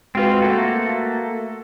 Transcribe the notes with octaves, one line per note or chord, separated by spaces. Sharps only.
G#3 C4 F4 F#4 B4
A3 A#3 F#4 A4